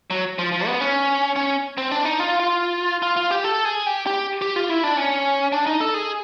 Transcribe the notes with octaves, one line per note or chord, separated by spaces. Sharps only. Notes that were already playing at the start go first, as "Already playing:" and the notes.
F#3
F3
F3
B3
C#4
C#4
C4
D4
D#4
F4
F4
F4
F4
G4
A4
G#4
G4
G4
G4
F4
E4
D4
C#4
D4
D#4
A4
G#4